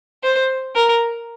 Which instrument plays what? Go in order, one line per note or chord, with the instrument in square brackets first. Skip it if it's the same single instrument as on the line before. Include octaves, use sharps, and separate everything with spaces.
[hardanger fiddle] C5
A#4